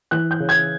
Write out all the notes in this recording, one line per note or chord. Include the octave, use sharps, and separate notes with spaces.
E3 F#6
G6
C#3
G#6